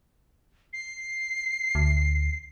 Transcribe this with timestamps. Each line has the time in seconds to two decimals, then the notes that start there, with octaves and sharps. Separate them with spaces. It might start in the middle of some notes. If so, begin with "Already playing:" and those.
0.73 C7
1.75 D2